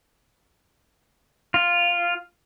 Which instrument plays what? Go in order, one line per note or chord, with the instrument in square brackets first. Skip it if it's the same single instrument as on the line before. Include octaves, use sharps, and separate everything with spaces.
[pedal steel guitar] F4